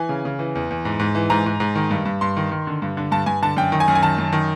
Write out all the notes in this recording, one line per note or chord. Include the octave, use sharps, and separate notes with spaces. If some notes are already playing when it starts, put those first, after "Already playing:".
Already playing: E3 G#5
C#3
C#3
E3
E2
E2
G#2
G#2
E3
G#2 A#5
G#2
G#2
D#3
G2
G2
G2 C6
D#3
D#3
D3
G2
D3
G2 A5
G2 G#5
D3 A5
F#2 G5
D#3
G#5
F#2
G#5
D#3 A5
F#2
D#3